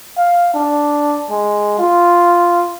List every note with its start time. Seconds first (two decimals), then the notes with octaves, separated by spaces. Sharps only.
0.18 F5
0.54 D4
1.30 G#3
1.79 F4